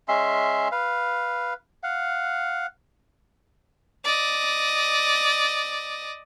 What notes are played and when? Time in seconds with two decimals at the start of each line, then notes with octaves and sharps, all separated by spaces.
0.08 G#3 C#4 E5 C6
0.72 B4 F5
1.83 F5 F#5
4.05 D5 D#5